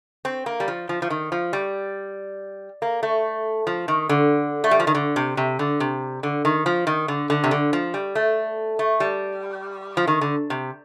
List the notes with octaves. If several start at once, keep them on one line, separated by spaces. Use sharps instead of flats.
C4
A#3
G3
F3
F3
F3
D#3
F3
G3
A#3
A3
F3
D#3
D3
A3
G3
F3
D#3
D3
C3
C3
D3
C3
D3
D#3
F3
D#3
D3
D3
C3
D3
F3
G3
A3
A3
G3
F3
D#3
D3
C3